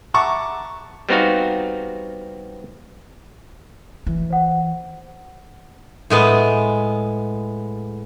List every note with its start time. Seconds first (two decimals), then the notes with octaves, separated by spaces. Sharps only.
0.14 E5 F#5 A5 A#5 C#6 D6
1.09 G3 B3 C4 D#4 F#4 F5
4.07 E3
4.30 C5 F#5
6.10 A2 G#3 B3